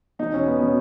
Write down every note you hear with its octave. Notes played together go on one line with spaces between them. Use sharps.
E2 B2 D#4
C#4
B3
B2 C#4